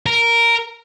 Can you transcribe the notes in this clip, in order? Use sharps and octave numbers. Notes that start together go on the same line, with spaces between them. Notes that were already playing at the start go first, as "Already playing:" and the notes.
A#4